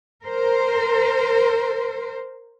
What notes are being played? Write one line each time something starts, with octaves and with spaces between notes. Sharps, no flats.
A#4 C5